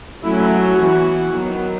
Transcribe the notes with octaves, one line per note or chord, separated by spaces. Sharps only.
F#3 A3 C#4 E4
F#4
E3 B3
D#3 F#3 B3